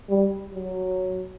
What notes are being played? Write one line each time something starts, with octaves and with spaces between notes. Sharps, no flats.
G3
F#3